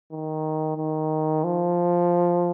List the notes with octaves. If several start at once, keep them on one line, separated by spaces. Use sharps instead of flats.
D#3
D#3
F3